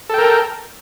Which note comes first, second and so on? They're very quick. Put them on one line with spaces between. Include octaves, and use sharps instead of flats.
A4 G5 A#4